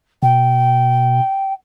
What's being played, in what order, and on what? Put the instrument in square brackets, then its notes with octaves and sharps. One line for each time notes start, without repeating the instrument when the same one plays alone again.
[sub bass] B2 [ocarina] G5